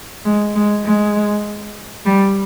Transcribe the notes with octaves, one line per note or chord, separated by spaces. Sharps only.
G#3
G#3
G#3
G3